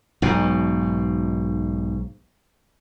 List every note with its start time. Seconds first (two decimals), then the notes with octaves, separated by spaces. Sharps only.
0.22 B1 G#2 B2